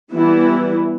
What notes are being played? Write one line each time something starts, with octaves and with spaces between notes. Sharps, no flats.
E3 G3 B3 E4